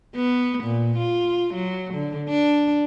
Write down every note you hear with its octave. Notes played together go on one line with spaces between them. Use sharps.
B3
A#2
F4
F#3
D3
D4